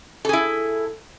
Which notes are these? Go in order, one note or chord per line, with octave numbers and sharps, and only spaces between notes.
E4 G#4 A4